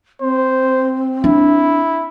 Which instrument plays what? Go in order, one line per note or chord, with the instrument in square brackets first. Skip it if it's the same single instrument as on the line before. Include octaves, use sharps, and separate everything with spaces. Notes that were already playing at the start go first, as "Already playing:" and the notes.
[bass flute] C4 [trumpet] C5
[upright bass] D4 [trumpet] E4